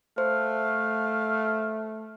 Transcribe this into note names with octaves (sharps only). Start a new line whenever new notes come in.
A3 C5 F5